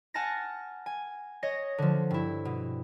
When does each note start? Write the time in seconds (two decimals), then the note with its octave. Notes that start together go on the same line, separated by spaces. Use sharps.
0.14 F#5 G#5 A5 F6 A6 A#6
0.86 G#5
1.43 C#5 D#5 A#6
1.78 D3 F3
2.11 G2 E4
2.45 B2